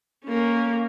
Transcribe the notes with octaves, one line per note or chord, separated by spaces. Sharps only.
A#3 C#4